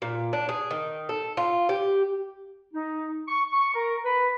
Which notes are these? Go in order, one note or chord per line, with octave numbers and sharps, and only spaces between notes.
A#2
D4
G#4
D#3
A4
F4
G4
D#4
C#6
C#6
A#4
B4